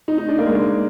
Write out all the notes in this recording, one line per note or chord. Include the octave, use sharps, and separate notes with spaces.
D#4
D#4
D4
A#3
G#3
A#3